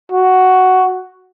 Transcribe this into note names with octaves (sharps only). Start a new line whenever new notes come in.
F#4